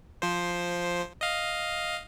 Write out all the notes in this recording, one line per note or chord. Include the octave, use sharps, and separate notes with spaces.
F3 C5
D#5 F5